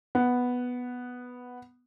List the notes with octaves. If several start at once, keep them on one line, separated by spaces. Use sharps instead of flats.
B3